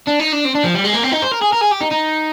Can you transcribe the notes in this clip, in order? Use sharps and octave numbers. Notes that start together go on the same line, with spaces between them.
D4
D#4
D4
C4
D4
F3
G3
G#3
A#3
C4
D#4
C5
A#4
G#4
A#4
G#4
G4
D#4
D#4